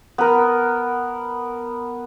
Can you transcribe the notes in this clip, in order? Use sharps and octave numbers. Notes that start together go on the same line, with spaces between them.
B3 A#4